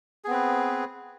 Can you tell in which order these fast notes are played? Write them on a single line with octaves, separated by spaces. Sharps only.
G#4 B3 C4 B4